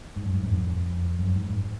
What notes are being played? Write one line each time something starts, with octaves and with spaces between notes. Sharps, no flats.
G#2
F#2
G#2
F#2
F2
F#2
G#2